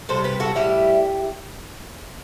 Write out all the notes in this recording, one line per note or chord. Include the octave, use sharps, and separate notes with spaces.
C3 G3 A4 C5
G4 B4
F#4 A4
A2 G3 E4 G4